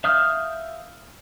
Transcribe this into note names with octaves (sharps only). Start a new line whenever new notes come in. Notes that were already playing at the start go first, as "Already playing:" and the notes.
E5 F5 D#6 F6 G6